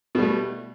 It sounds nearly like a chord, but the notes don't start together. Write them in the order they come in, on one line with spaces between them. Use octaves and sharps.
B2 G3 A3